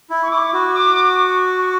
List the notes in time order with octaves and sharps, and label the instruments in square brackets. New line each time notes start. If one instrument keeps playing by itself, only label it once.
[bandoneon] E4
[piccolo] C#6
[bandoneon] E4 [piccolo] D6
[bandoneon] F#4
[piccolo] D6
C#6
C#6